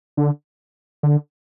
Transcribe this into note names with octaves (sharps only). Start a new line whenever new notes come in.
D3
D3